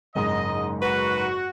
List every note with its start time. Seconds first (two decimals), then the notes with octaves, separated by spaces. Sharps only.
0.15 F#1 G#2 D#5
0.82 F#4 B4